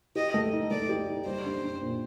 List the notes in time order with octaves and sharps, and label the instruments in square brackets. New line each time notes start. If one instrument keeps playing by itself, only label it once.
[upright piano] G4 [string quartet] D#5
[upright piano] A3
D#4
[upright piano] A3 [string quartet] D5
[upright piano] G4
D#4
[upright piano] G3 [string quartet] C5
[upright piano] D4
D4
A#2